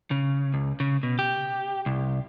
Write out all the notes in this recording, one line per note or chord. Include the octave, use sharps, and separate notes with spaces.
C#3
C#2
C#3
B2
G4
C2